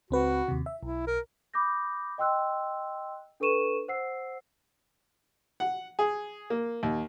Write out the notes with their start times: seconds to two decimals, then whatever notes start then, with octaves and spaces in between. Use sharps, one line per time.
0.11 C#2 C4 F#4 B4
0.48 D#2 C3
0.66 E5
0.83 B1 E4
1.07 A#4
1.54 B5 D6 D#6 G6 A#6
2.18 D#5 G5 C6 E6 F#6
3.40 D4 A4 B4 C#6 D#7 E7
3.88 C5 F#5 E6 C7
5.60 F#5
5.99 G#4
6.50 A#3
6.83 D#2